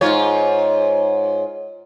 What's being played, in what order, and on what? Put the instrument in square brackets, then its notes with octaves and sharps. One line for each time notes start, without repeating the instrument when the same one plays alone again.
[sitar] G#2 F4 C#5